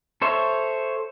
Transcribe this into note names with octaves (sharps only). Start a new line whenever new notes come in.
A4 C5 C#5 E5